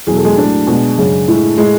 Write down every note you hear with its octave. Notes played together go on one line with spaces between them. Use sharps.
E2 B2 F#3 G#4
A4
G#3 G#4
A2 F#3 A3 D4
B2 G#3
F#2 C#3 G#3
A2 G#3
A2 G#3